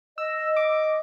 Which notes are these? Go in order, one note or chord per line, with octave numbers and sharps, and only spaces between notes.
D#5 E6
D6